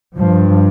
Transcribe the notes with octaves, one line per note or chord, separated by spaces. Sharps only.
G2 F3